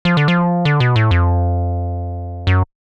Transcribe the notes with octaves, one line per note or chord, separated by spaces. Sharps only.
F3
D3
F3
D3
B2
A2
F2
F#2